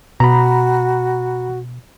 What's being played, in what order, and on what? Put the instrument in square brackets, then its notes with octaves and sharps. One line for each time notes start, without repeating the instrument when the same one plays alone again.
[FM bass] B2 [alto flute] F#4 [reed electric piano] A#5 B5